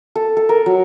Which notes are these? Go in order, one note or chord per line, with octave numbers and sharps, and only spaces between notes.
A4
A4
A#4
F#3